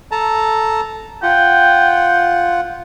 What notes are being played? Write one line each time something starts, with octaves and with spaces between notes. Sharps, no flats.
A4 A5 A#5
F4 F#5 G5